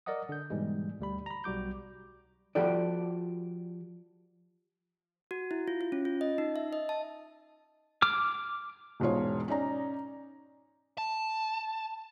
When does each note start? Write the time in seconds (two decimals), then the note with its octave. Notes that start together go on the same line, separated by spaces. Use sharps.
0.06 A#4 D5 D#5 F#5 D#6
0.29 D3 G6
0.50 G#2 B2 E3 G3 G#3
1.00 D2 G3 B5
1.26 A#5 B5
1.44 B1 G3 F#4 D6 G6
2.55 F3 F#4 G4 A4 D5
5.31 F#4
5.51 E4
5.68 F4
5.81 F4
5.92 C#4
6.05 F4
6.21 D#5
6.38 D#4
6.56 E5
6.73 D#5
6.89 A5
8.02 D6 F6
9.00 E1 G#2 B2 F4 C#5
9.48 C#4 D#4 D5 A#5
10.98 A5